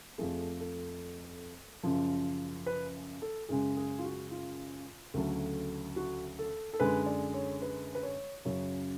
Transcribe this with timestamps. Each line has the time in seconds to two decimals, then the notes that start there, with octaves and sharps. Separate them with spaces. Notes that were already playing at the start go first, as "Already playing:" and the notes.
0.18 F2 F3 A3 G#4
0.60 A4
1.83 F#2 C#3 F3
2.66 B4
3.22 A4
3.49 F#2 C#3 G#3 G#4
3.77 G#4
3.99 F4
4.04 F#4
4.31 F4
5.14 D2 C#3 F#3 A3
5.96 F#4
6.39 A4
6.73 A4
6.80 F#2 D3 G#3 B4
7.06 D5
7.34 C#5
7.62 B4
7.95 B4
8.03 C#5
8.45 F#2 C#3 F#3 C#5